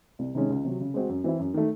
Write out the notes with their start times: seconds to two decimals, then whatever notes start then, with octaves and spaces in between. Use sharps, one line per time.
0.19 C2
0.35 C3 D#3 G#3 C#4
0.50 C#2
0.64 C3 F#3
0.80 C#3
0.94 G#3 C4 F#4
1.09 F#2
1.24 E3 C4 E4
1.39 F#2
1.54 D#3 A3